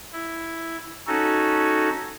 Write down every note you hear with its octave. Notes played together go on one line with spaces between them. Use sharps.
E4
C#4 D#4 F#4 A4